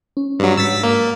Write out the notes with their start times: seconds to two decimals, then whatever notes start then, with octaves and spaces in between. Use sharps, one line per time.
0.17 C#4
0.39 G2 F#3
0.57 G#2 E6 A6 B6
0.84 A#3